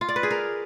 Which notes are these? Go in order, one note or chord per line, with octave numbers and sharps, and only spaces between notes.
F4
D5
B4
G#4
A#4